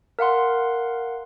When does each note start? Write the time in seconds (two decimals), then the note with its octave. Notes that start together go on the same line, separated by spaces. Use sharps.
0.19 A#4 F5 F#5 C6